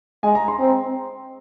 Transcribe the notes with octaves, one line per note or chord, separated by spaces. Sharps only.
G#3 G#5
A#5
C6
C4